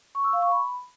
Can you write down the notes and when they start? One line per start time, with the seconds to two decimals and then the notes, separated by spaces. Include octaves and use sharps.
0.15 C#6
0.24 E6
0.33 F5
0.42 C#6
0.51 B5